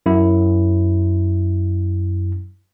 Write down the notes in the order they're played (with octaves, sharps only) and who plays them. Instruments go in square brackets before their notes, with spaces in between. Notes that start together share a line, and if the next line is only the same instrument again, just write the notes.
[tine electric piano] F#2 E4